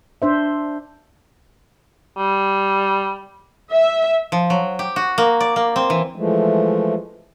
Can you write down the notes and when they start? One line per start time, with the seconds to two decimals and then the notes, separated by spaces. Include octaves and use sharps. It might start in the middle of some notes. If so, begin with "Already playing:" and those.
0.22 D4 C5 E5
2.18 G3
3.72 E5
4.32 F3
4.50 F#3
4.79 G4
4.96 F#4
5.18 A#3
5.40 D5
5.56 A#3
5.76 C4
5.90 E3
6.16 E3 F3 G#3 A3